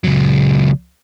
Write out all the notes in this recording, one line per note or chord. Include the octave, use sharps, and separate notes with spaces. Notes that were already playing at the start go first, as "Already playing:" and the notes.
C#2 F#3